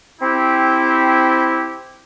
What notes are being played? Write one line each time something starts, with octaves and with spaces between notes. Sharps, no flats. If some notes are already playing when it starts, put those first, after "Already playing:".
C4 E4 G4